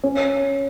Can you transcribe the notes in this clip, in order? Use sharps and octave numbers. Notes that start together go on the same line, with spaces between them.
C#4